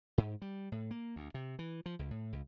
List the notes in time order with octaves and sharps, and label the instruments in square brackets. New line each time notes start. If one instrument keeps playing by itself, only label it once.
[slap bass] G#2
G3
A2
A#3
D2
C3
E3
F3
C#2
A2
C#2